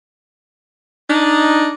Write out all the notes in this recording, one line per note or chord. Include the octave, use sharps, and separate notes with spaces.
D4 D#4